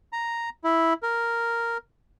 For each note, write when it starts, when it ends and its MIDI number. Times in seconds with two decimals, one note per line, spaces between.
0.13 0.49 82
0.64 0.93 64
1.03 1.77 70